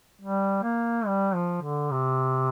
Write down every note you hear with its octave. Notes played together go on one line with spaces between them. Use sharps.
G3
A#3
G3
F3
D3
C3